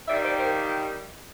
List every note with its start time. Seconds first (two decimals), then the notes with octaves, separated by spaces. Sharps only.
0.08 D#3 G3 A#3 D#4 D5 E5
0.24 C5 D5
0.39 A#4 C5